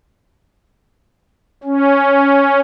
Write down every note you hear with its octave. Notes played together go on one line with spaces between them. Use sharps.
C#4